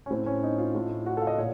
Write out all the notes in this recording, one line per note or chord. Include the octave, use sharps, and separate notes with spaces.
C#4
A2 C4
C#4
D#4
F4
A2
F#4
A4 F5
D#5
A#2 C#5